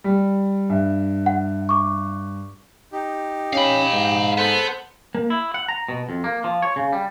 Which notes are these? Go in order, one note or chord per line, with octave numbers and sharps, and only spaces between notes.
G3
G2 E5
F#5
C#6 D6
D#4 G4
C#4 F5 B5
G#2
B3 A4 C5 F#5
A#3
E4
F#5
A#5
B2
F2
A#3
F3
C#5
C#3
G3